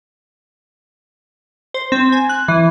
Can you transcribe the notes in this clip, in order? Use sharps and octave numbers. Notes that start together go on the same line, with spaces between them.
C5
C4
G#5
F#6
E3